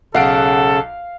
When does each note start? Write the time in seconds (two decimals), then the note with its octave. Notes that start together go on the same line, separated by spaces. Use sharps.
0.14 B1 C#3 A4 F5 F#5 D7